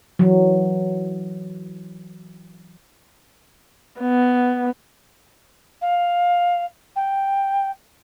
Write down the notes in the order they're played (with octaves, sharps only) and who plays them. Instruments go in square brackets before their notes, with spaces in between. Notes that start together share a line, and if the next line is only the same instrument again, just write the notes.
[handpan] E3 F#3
[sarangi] B3
[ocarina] F5
G5